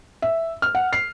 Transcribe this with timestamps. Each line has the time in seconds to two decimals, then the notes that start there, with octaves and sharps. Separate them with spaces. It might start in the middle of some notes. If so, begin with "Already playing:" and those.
0.22 E5
0.62 F6
0.75 F#5
0.93 C7